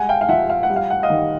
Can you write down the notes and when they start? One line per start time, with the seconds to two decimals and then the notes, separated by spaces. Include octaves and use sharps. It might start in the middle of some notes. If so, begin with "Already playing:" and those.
Already playing: G3 G#3 F#5 G#5
0.09 F5 G5
0.21 F5
0.29 F3 E5 F#5
0.49 F5
0.63 F#5
0.70 G3
0.76 F5
0.90 F#5
1.03 D#5 F5
1.10 D#3